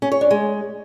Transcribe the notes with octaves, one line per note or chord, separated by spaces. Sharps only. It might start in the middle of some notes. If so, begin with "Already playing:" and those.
C#4
C#5
D4
G#3